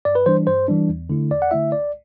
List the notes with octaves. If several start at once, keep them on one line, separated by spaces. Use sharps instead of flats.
G2 D5
B4
E3 G3 D4 C5
G2 C5
E3 G3 D4
E2
D3 A3 E4
E2 D5
F#5
D3 A3 E4 E5
C2 D5